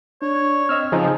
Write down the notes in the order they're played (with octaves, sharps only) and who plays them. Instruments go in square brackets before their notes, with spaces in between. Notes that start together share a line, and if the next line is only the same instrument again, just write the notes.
[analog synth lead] D4 [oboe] C#5
[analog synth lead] C4 [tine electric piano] D#5 E6 F6
[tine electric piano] C#3 D#4 G#4 [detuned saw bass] F3